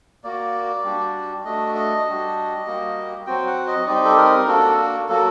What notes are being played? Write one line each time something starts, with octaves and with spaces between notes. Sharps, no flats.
A#3 F#4 D5
G3 D4 F#4
A3 D4 F#4 D#5
D#5
G3 D4 F#4
G3 A#3 F#4
F#3 C4 F#4 G5
F#5
D#5
G3 C4 D#4 D5
A4
A#4
A#3 D4 F#4 A4
F#3 A#3 F#4 A4